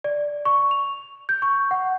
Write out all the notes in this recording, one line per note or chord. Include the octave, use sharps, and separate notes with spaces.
D5
C#6
F7
G6
C#6
F#5